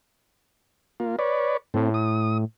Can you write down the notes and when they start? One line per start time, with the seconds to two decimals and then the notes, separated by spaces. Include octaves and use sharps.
1.00 A#3 F4
1.19 B4 C#5 D5
1.74 A2 A3 C4
1.94 D#6